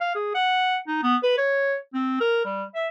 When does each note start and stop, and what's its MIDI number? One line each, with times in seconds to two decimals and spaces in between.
0.01 0.14 77
0.15 0.33 68
0.34 0.78 78
0.87 0.99 63
1.03 1.16 59
1.23 1.37 71
1.38 1.77 73
1.94 2.16 60
2.20 2.44 70
2.45 2.63 55
2.75 2.88 76